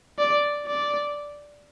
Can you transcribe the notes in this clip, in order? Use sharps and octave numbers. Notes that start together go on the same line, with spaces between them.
D5
D5